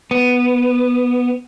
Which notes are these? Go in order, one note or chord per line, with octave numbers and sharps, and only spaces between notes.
B3